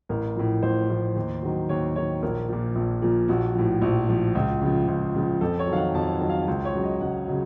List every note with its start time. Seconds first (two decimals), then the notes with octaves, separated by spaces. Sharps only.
0.09 A1 A#4
0.36 A2 F3
0.63 A1 C5
0.90 A2 F3
1.16 D#2
1.43 D#3 F#3
1.69 D#2 C#5
1.95 D#3 F#3 C#5
2.22 A#1 A#4
2.49 A#2 F3
2.75 A#1
3.02 A#2 F3
3.28 A#1 F#4
3.55 A2 F3
3.82 A#1
4.08 A2 F3
4.35 C#2
4.61 C#3 F3
4.88 C#2
5.15 C#3 F3
5.41 F2 A4
5.59 C#5
5.67 F#3
5.72 D#3 F5
5.76 F#5
5.95 F2 A5
6.13 F#5
6.21 D#3 F#3
6.30 F5
6.48 C#2
6.65 C#5
6.74 C#3 F#3
6.83 D#5
7.00 C#2 F#5
7.28 C#3 F#3